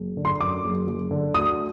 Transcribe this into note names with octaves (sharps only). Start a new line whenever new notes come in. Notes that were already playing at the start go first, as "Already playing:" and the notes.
Already playing: F#1
D3
C6
F#2 D6
F#1
F#1
D3
D2 D#6